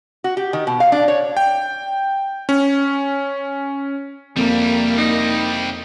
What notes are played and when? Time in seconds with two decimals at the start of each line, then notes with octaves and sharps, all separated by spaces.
0.24 F#4
0.37 G4
0.53 D#3
0.67 B2
0.80 F5
0.92 D4
1.08 C#5
1.37 G5
2.49 C#4
4.36 C2 F2 G3 A#3
4.98 D#4